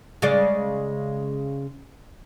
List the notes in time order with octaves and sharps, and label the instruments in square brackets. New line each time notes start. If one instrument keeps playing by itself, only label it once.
[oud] C#3 G#3 D5